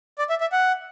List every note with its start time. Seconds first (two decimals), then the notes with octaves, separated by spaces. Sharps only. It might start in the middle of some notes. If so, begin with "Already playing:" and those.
0.18 D5
0.29 E5
0.41 E5
0.52 F#5